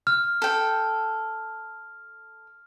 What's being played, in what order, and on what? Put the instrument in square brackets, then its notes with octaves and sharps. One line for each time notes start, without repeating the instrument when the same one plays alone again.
[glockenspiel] F6
[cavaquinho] A4 G5